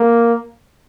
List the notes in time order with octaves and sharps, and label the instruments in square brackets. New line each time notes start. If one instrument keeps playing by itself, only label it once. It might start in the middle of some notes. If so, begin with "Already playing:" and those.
Already playing: [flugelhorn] A#3